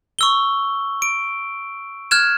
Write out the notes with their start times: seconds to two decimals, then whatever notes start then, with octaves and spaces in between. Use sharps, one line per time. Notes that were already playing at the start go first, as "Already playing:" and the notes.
0.19 C#6 E6 G7
1.02 D7
2.11 F6 F#6 G#6 E7